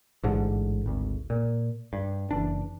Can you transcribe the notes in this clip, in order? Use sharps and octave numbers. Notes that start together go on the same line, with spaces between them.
A1 G#2 D3
G#1 D2
A#2
G2
F#1 E3 D4